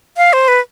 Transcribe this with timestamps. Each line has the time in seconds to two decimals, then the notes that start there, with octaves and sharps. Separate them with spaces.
0.17 F5
0.33 C5
0.48 B4